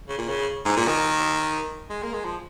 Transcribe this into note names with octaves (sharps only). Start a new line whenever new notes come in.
C#3
A#2
C#3
G#2
A#2
D#3
G#3
A#3
G#3
F3